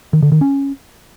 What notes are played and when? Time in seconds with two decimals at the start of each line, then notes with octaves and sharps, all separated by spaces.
0.13 D#3
0.23 D3
0.32 D#3
0.41 C#4